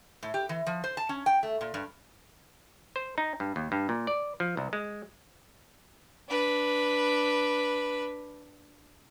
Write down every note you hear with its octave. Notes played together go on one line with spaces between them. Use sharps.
A2
G4
E3
F3
C5
A5
C#4
G5
A3
A#2
G2
C5
D#4
G2
D#2
G2
A#2
D5
F3
C2
G#3
D4 B4